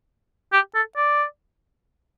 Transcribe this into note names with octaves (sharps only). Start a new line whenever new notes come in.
G4
A4
D5